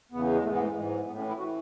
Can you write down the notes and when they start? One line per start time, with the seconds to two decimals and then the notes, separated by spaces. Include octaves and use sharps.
0.12 E2 C#3 E3 B3
0.33 G#3
0.43 G#2 A3
0.47 E3 B3
0.59 A3
0.76 G#2 E3 G#3
0.91 F#3
1.06 A2 E3 B3
1.18 C#4
1.28 E4
1.38 E3 F#4